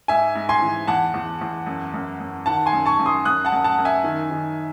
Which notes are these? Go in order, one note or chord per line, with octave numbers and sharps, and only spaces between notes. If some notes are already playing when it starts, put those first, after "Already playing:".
G#2 E5 G#5
G#2
G#5 C6
E3
E2 F#5 A5
E2
E2
F#2
F#2
F#2
D#3 F#5 A5
G#5 C6
F#2
A5 C#6
F#2
C6 D#6
F#2 D#6 F#6
F#5 A5
F#2
F#5 A5
F#2
E5 G#5
D#3
D#3